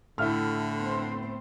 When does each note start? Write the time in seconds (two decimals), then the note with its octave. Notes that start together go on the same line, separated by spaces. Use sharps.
0.18 A2 D3 A3 E4 E5 F6
0.78 B3 C4 C5